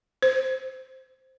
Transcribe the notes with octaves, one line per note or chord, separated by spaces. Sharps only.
C5